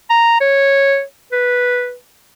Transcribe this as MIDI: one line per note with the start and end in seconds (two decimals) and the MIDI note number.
0.10 0.38 82
0.40 1.02 73
1.32 1.94 71